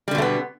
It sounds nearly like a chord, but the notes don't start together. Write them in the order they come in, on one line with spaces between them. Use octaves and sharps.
G3 D3 B2 A3 B3